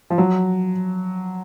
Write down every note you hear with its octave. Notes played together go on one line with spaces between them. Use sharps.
F3
F#3